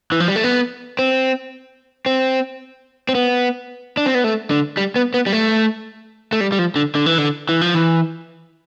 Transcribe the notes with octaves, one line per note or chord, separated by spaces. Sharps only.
E3
F3
G3
A3
B3
C4
C4
C4
B3
D4
C4
B3
A3
D3
G3
B3
B3
G3
A3
A3
G3
G3
F3
D3
D3
E3
D3
E3
F3
E3